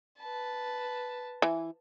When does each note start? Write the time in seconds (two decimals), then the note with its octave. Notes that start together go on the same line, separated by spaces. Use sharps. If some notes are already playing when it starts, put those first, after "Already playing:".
0.20 B4 A5
1.42 E3